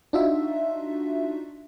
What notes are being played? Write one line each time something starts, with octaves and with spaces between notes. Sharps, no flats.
D4 D#4 F4 F#4 E5